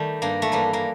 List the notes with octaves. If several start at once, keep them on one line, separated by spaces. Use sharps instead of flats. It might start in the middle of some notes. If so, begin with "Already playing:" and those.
Already playing: D#3 G3 A3
G2 A#3
A3
E3 G3 A#3
A#3